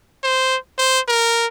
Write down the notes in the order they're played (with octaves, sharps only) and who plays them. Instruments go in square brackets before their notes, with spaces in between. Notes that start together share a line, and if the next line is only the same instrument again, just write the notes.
[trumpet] C5
C5
A#4